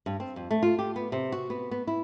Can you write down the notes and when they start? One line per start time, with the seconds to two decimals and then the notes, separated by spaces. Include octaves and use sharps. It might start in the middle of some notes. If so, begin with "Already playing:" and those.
0.06 G2
0.20 C4
0.36 F2
0.51 A3
0.63 F4
0.79 G4
0.96 B3
1.12 C3
1.32 F#4
1.50 B3
1.71 B3
1.87 E4